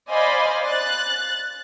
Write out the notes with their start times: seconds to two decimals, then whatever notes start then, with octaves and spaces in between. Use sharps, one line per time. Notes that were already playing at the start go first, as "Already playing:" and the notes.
0.11 C5 D5 D#5 F5 G#5 B5
0.66 F#6 A6